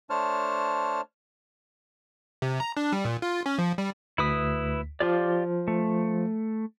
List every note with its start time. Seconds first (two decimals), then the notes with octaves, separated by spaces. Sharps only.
0.10 A3 D4 C5 C#5 A5 F6
2.42 C3
2.60 A#5
2.77 D4
2.92 G3
3.05 A#2
3.22 F4
3.46 C#4
3.58 F3
3.78 G3
4.18 D2 E4 B4 D#6 B6
5.00 F3 F4 G4 D5
5.68 A3